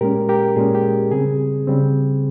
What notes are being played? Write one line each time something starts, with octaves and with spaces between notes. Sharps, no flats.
A#2 G#3 C#4 G4 A#4
G4 A#4
A#2 G#3 C#4 G#4
G4
C#3 G3 C4 G#4
C#3 G3 C4